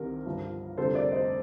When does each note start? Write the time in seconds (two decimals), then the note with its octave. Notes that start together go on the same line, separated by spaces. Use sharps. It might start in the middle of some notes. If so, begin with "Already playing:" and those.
Already playing: C2 C3 D#3 A#4
0.26 G1 G2 F3
0.77 F1 F2 D3 G3 A4 C5
0.95 A#4 D5
1.12 C5 D#5